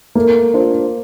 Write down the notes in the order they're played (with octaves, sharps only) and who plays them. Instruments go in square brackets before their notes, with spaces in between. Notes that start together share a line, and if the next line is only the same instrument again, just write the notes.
[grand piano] A3 [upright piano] A#3
[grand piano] D4 F4 C5